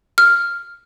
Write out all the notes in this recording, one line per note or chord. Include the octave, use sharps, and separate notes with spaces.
F6